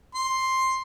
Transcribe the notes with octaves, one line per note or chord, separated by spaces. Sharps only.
C6